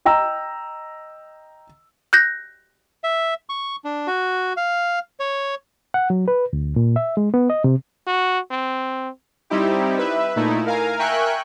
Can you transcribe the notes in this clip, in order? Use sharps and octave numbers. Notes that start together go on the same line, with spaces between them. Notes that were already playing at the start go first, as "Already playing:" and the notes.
D#5 G5 A#5 E6
F#6 G6 A#6
E5
C#6
D4
F#4
F5
C#5
F#5
F#3
B4
D2
A#2
E5
G#3
B3
D#5
C3
F#4
C4
G3 C4 D#4 E4 G4
B4 E5
A#2 A3 D#4 E4
A#4 F5 G#5 A#5
A#4 E5 G5 G#5 C#6 F#6